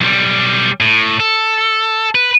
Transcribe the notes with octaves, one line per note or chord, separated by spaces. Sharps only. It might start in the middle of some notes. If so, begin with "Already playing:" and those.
B1 G3
A2
A4
B4